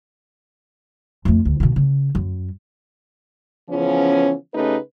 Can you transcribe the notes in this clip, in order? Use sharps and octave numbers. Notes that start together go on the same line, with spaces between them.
F2 A3
D2
B2 D#3
C#3
F#2
C#3 E3 F3 B3 C#4
C#3 A3 C#4 D#4 G4 B4